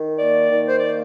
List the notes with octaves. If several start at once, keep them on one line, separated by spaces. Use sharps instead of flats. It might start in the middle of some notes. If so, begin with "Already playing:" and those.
Already playing: D#3
A#3 D5
D#3
C5
A#3 D5